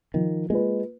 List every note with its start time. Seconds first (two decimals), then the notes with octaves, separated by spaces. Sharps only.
0.14 D#3 F3
0.50 G#3 A#3 F4 B4